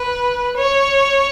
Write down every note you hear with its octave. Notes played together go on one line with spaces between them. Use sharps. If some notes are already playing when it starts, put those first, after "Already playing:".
Already playing: B4
C#5